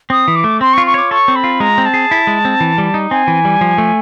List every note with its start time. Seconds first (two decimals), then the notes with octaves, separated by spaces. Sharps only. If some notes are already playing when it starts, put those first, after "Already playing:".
0.10 C4 D#6
0.28 E3
0.35 D6
0.44 A3
0.61 C4 C6
0.73 C#6
0.78 F4
0.86 C#6
0.94 C#5 D6
1.10 A4 C#6
1.28 C4
1.35 B5
1.44 F4
1.60 G#3 A#5
1.78 C4
1.85 A5
1.94 G#4
2.11 E4
2.27 G#3
2.45 C4
2.60 E3
2.78 G3
2.94 D#4
3.11 C4 G#5
3.28 E3
3.45 G3
3.61 F3
3.78 A3